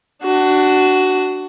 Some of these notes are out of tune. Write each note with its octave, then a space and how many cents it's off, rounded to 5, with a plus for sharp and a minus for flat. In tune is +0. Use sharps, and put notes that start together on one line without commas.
D4 +10 F#4 +15